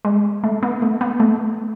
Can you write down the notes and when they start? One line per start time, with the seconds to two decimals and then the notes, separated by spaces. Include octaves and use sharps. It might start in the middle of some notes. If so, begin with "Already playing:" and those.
0.05 G#3
0.44 A3
0.63 B3
0.82 A3
1.01 B3
1.20 A3